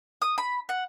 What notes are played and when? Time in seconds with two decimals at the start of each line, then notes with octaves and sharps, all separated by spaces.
0.22 D#6
0.38 B5
0.69 F#5